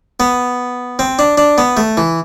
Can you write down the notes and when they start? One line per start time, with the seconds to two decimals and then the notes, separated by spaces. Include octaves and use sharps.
0.20 B3
0.99 C4
1.19 D4
1.38 D4
1.58 B3
1.77 A3
1.97 E3